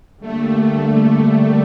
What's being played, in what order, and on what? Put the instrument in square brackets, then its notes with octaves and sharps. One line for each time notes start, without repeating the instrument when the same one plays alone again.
[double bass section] D3 G3 A#3 [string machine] A3